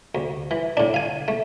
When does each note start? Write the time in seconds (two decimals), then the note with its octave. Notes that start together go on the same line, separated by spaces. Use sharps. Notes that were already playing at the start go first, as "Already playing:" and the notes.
0.15 D2
0.51 E3
0.77 A2 D4
0.94 F5 G#5
1.28 A3